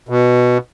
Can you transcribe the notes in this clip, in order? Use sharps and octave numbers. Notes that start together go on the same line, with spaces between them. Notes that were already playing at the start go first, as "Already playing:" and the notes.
B2